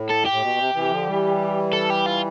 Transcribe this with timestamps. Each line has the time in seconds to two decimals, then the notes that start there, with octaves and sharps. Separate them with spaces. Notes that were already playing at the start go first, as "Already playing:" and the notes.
Already playing: A2
0.09 A4
0.25 G4
0.32 A2
0.42 B2
0.59 C3
0.75 C3 E3
0.91 D3 F3
1.07 E3 G3
1.73 A4
1.90 G4
2.06 F4